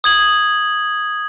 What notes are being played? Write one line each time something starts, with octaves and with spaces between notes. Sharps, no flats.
D#6 G#6 F#7